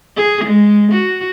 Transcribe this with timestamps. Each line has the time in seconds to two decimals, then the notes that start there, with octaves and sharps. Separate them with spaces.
0.16 G#4
0.45 G#3
0.92 F#4